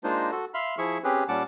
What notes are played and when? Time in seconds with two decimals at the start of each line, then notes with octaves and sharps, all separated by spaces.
0.04 G#3 A#3 D4 D#4 F4 C5
0.31 F#4 A4
0.54 E5 F5 B5 C6 F6
0.78 F3 E4 G#4 E5 C#6
1.04 C4 C#4 G4 G#4 B4
1.28 A#2 G3 C#4 F#5 A5 D6